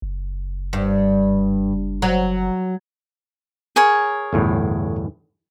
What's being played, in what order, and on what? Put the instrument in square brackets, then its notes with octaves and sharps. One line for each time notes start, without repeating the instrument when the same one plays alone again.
[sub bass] F#1
[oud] G2
F#3
[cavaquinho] G#4 A#4 C#5
[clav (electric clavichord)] G1 E2 A2